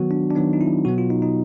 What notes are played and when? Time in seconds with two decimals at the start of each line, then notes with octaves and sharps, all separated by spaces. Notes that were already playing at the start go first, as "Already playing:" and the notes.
Already playing: D#3 F#3 B3 F#4
0.11 D4
0.30 D4
0.36 D#3 F#3 B3 D#4
0.53 D#4
0.61 E4
0.85 B2 F#3 B3 F#4
0.98 F4
1.10 D#4
1.22 D#4